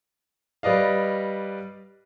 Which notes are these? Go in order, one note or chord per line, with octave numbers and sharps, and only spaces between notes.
G3 B4 D5 D#5 F5